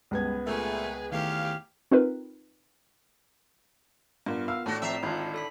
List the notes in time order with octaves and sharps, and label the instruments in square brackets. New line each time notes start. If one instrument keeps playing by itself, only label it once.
[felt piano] C#2 B3 G#6 [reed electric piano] G3 G#3
[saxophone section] A#2 A3 [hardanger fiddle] G#4 B4 [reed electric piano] E5 C#6
[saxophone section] E2 C#5 F5 [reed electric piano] D#3 A3 [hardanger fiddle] G4
[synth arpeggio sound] C4 D#4 F4 A#4 B4
[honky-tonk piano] G2 [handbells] B3 F4 A#4
[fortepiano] F5 [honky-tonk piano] E6
[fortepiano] A2 [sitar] D4 F#4 [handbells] D5
[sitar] F3 E5 [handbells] C4 A#5 C7
[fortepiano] G#1 F4 [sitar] A2 D3 [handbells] G6 G#6
[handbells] A4 B5 B6